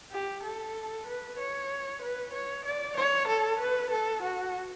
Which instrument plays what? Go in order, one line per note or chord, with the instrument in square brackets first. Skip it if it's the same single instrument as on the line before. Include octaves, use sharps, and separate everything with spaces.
[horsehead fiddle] G4
A4
B4
C#5
B4
C#5
D5
C#5
A4
B4
A4
F#4